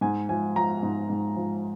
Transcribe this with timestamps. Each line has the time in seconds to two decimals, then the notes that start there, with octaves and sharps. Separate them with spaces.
0.01 G#2 G#5
0.29 F3 G#5
0.56 F3 A#5
0.83 G#2
1.10 G#2
1.36 F3